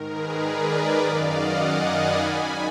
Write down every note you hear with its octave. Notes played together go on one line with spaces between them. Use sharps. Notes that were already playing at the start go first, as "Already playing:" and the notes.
Already playing: G#2 D#3 A#4
G#4 B4
A#4 D5
B4 D#5
F#2 D#3 D5 F5
D#5 F#5
F5 G#5
G#5 B5
G#2 D#3